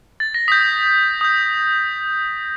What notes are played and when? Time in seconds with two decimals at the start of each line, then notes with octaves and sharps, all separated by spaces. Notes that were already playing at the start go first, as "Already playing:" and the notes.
0.20 A6
0.34 A#6
0.48 D#6 G6 B6
1.21 D#6 G6